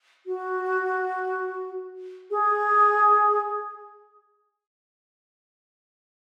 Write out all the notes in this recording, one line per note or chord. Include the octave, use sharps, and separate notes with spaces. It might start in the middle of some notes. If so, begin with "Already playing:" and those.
F#4
G#4